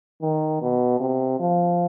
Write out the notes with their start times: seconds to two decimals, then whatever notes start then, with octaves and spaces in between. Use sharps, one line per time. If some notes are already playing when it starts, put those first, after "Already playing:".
0.22 D#3
0.62 B2
1.00 C3
1.40 F3